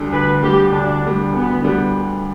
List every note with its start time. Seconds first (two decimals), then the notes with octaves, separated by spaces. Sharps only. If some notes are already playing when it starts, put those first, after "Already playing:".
Already playing: D2 D3 G3
0.12 D2 B4
0.42 D3 G3 G4
0.72 D2 D4
1.02 D3 G3
1.32 D2 B3
1.61 D3 G3